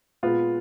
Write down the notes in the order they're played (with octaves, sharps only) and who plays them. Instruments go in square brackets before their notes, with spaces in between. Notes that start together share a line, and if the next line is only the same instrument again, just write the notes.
[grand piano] A#2 G#3 B3 F4